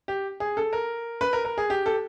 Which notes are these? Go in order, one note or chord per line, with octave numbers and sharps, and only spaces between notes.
G4
G#4
A4
A#4
B4
A#4
A#4
G#4
G4
A4